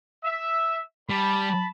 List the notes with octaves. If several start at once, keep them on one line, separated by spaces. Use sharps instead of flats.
E5
G3 A5 B5